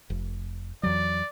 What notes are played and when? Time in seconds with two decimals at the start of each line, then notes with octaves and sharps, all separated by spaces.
0.10 F1
0.83 F2 E3 F#3 D5